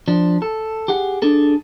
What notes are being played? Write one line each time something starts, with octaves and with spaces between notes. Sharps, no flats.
F3 D4
A4
G4 G#4 F#5
D4 G#4 A4